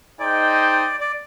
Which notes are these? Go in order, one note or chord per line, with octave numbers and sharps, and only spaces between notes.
D#4 G#4 C5 D5 D#5 G5
D5